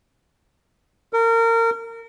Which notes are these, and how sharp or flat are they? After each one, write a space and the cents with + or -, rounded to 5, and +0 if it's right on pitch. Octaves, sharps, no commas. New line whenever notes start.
A#4 -30